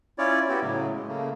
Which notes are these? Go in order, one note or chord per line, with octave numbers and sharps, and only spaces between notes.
C#4 E4 F4 C#5 D5
B3 E4 F#4 G4
A2 C#3 F#3
G#3
C#3 A3 A#3